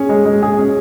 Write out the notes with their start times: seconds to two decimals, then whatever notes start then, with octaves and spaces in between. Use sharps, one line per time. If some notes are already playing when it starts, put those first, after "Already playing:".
Already playing: C#4 G#4
0.09 G#3
0.26 G#3
0.43 G#4
0.59 C#4